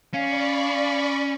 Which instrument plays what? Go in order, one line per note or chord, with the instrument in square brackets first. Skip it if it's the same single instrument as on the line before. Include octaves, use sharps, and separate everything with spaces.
[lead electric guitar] C#4 [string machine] D5 B5 C#6 [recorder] F5